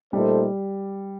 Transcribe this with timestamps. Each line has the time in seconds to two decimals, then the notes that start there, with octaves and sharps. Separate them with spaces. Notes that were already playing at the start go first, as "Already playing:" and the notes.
0.13 A#2 G3 A3 D#4 A4 C5